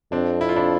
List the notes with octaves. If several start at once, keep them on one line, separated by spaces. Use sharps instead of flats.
F2 C4 D4
E4
F4
D4 E4